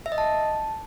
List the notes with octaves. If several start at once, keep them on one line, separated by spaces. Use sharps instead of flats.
E5
D#5
A5